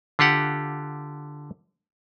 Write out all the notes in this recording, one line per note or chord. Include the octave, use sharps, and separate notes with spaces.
D3 F4 G4 F#5